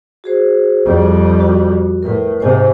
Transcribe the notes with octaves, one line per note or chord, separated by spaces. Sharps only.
F#4 G#4 C5
F2 G3
F#4
A2 A#4 B4
G#2 C3 C5 G#5